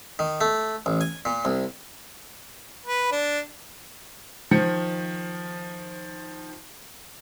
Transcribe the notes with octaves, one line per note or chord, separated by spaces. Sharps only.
D#3
A3
A1
G#5
A#2
C2
B4
D4
D#3 F3 C#7